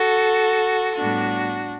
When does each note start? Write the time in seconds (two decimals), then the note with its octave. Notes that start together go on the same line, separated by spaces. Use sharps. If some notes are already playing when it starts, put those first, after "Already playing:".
Already playing: F#4 A4
0.95 A2 G3 B3 D4 F#4